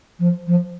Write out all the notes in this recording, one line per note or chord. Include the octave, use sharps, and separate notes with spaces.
F3
F3